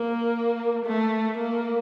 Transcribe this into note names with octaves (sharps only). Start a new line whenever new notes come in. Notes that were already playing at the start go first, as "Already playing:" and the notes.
Already playing: A#3
A3
A#3